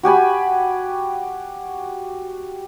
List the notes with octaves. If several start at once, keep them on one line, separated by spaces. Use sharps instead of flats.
F#4 G4 G#5 B5